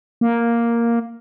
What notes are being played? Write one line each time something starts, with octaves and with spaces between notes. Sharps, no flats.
A#3